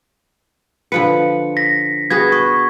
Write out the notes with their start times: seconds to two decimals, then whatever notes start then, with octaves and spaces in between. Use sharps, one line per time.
0.92 D3 F3 B4 C#7
1.57 A#6 B6
2.10 B3 F#4 G#4 G#6
2.32 B4 C#6